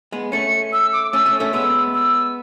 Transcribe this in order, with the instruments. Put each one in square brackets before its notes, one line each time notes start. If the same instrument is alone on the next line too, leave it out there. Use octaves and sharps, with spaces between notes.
[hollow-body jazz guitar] G#3 B3
[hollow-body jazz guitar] A3 C#4 [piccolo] C#7
[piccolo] E6
D6
[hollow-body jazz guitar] A3 C#4 [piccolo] E6
[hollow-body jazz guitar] A3 C#4
A3 C#4
[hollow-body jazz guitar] G#3 B3 [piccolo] E6
[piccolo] E6